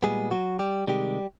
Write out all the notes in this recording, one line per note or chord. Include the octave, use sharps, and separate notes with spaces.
A#2 G3 G#3 B3 G#4
F#3 F#4
G3 G4
C3 D#3 G3 G#3 G4